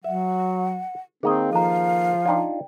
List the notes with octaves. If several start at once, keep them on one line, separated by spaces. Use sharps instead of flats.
F#3 E5 F#5
D#3 A#3 C4 G#4 D#5
F3 A4 F5 A#5
D4 D#4 F4 D5 G5